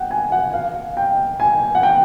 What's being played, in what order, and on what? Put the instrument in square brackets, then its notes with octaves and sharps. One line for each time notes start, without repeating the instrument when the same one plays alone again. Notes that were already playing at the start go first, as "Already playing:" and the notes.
Already playing: [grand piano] F#5 G5
G#5
F#5
F5
G5
G#5
F#5
G5